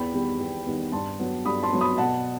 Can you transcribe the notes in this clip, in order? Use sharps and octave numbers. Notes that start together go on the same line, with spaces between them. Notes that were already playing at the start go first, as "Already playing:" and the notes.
Already playing: E2 G5 B5
D#3 G3 B3
E2
D#3 G3 B3
G2 A5 C6
F#3 B3
G2 B5 D#6
A5 C6
F#3 B3
B5 D#6
B2 F#5 A5